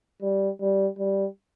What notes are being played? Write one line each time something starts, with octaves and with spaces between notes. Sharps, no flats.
G3
G3
G3